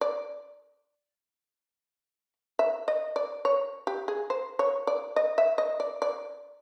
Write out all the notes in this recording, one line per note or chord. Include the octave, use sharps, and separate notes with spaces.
D5
E5
D#5
D5
C#5
G4
G#4
C5
C#5
D5
D#5
E5
D#5
D5
D5